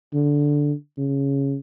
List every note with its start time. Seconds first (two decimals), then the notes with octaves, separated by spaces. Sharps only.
0.13 D3
0.98 C#3